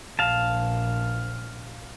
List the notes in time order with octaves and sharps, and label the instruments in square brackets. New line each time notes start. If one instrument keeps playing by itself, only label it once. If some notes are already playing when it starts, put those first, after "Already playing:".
[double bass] A#1 [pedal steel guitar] F5 A5